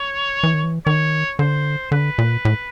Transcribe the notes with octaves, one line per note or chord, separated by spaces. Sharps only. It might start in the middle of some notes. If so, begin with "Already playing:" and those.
Already playing: C#5
E3
D#3
E3
D#3 C#5
D3 C5
D3 B4
A#2
A2